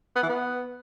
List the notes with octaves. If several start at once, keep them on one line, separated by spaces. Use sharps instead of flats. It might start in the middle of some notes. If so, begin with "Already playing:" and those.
B3
E3
B3